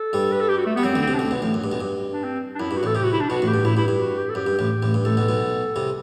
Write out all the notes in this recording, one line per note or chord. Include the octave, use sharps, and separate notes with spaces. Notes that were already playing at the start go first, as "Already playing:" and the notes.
Already playing: A4
G2 G3
B4
A4
G4
F#4
A3
G3 B3
F#2 F#3 C4
D2 D3
C4
C2 C3
D4
D2 D3 C4
B1 B2
A1 A2
F#2
G2
B1 B2
G2
D4
C4
D4
F#2 E4
G2
F#4
A1 A2 A4
C2 C3 G4
F#4
E4
D4
B1 B2 F#4
A1 A2
G4
G2
A1 A2 E4
G2 E4
G2 E4
F#4
G4
A4
F#2 G4
G2
A1 A2
A1 A2
G2
A1 A2 A4
B1 B2
B1 B2
C2 C3